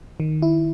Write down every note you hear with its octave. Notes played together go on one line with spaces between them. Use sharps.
D#3
E4